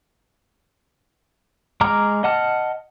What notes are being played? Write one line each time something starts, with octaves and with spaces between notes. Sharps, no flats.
G#3 A#5 D6 F6
D#5 F#5 A5 F6